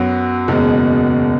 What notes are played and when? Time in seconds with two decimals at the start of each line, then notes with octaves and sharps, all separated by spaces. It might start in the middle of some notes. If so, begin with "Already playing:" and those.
Already playing: F#2 F#3 B3 F#4
0.48 F#1 E2 B2 G#3